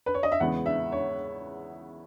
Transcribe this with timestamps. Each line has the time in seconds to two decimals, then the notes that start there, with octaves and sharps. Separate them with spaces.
0.06 B4
0.14 C#5
0.23 D#5
0.32 E5
0.40 E2 C#3 G#3 B3 F#5
0.66 E5
0.92 C#5